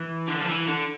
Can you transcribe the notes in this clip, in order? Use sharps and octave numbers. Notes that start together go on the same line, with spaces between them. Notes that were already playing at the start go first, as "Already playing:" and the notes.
Already playing: E3
D3
F3
E3
D3